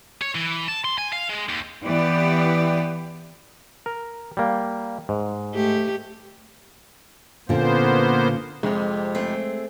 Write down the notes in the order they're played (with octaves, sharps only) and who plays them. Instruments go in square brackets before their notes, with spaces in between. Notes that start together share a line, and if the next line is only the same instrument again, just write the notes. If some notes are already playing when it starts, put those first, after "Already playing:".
[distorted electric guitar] C#5
E3
A5
C6
G#5
F5
G#3
D#2
[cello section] E3 B3 G4 B4 D5
[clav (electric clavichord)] A#4
G3 A#3
G#2
[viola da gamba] A3 G4
[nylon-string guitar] A#2 D3 C#4 [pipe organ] A#3 B3 C5
[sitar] F2 C3 D#3 [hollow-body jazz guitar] G#3
[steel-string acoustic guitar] A3 C4 G#4